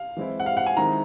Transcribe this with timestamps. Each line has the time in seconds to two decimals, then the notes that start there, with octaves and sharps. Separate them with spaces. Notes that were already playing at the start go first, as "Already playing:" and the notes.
Already playing: F5
0.17 E3 G#3 C4 E4
0.40 F#5
0.46 F5
0.57 F#5
0.66 G#5
0.77 D#3 G#3 C4 E4 A#5